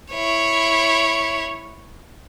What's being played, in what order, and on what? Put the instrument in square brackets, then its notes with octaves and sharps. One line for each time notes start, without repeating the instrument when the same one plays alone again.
[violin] E4 C#5